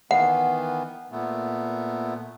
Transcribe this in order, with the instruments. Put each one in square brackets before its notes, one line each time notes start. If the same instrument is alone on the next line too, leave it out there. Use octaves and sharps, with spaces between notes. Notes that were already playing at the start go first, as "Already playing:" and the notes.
[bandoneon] D#3 E3 B3 [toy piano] F#5
[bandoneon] A#2 A3 B3